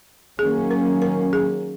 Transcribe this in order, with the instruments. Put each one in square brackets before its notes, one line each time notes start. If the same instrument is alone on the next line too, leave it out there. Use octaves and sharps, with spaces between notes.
[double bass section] D#3 F#3 A#3 C#4 [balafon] G#4
[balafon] A#4
A#4
G#4